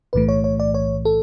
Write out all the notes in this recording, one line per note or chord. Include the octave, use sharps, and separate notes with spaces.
B1 A2 E3 A3 B4
C#5
C#5
D5
C#5
A4